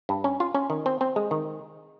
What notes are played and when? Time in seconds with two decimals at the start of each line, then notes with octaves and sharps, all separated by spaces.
0.09 G2
0.24 C#4
0.40 F4
0.55 C#4
0.70 D#3
0.86 C4
1.01 C4
1.16 G#3
1.31 D#3